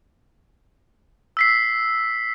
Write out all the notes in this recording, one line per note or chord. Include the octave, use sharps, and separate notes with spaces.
E6 B6 C7